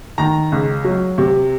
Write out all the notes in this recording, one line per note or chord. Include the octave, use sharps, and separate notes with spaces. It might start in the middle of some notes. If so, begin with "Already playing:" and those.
D#3 A#5
C#2
F#3
C3